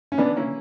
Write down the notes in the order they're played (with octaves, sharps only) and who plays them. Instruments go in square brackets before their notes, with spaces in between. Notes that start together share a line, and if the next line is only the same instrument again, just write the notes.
[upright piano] C#4
[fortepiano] E3 [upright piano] B3 D4
[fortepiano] A#3 C#4 E4